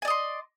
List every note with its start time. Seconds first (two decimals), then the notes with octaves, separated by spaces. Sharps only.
0.02 G#5
0.05 D5
0.08 D#5
0.10 C6